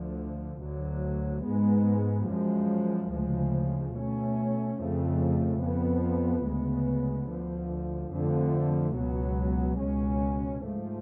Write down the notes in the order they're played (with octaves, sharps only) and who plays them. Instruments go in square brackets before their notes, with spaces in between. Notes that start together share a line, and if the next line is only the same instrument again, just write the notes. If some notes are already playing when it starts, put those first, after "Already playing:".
Already playing: [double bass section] D2 D3 F3
D2 D3 F#3
G#2 G#3 B3
F#2 F3 G#3
D2 C#3 F3 G#3
B2 A3 C#4
F2 C#3 F3 A3
F2 F3 B3
D2 C#3 G#3 B3
D2 D3 F3
F2 D3 F3 A3
C#2 B2 F#3 B3
C#2 B2 G#3 C#4
G#2 F3 A3